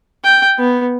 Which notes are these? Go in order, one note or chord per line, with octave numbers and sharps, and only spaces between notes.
G5
B3